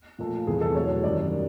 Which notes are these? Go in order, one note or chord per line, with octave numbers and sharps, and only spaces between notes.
A#2 F3 A3
E2 C3 E3 G3 G#4
A4
E2 B2 F#3 A3 C#5
F#2 D#3 G3 D5